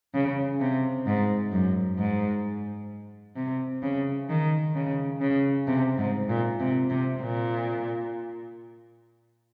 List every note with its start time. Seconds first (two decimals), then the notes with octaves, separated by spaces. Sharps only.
0.14 C#3
0.60 C3
1.06 G#2
1.52 F#2
1.98 G#2
3.36 C3
3.83 C#3
4.29 D#3
4.75 C#3
5.21 C#3
5.67 C3
5.98 G#2
6.29 A#2
6.60 C3
6.90 C3
7.21 A#2